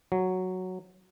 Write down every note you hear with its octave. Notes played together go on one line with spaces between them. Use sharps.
F#3